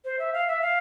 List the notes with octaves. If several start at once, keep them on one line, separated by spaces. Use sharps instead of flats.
C5
E5
F5
E5
F5